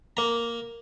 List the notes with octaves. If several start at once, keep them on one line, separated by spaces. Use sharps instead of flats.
A#3 A#5